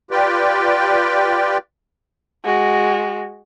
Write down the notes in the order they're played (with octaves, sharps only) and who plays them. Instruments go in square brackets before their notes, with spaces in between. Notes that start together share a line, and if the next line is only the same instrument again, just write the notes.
[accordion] F4 G4 B4 D5 G5
[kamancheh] G#3 F#4